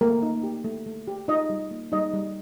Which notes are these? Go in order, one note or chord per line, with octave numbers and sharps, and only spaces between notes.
A3 A#3 A#4
D#4
G4
A3
A3
G4
D#4 F4 D#5
G3
A#3
G3 D#4 D#5
G3